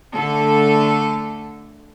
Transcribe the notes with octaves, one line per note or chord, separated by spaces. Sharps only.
D3 A3 A4